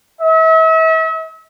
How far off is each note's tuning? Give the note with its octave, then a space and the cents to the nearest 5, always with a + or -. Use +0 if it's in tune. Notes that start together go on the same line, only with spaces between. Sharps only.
E5 -40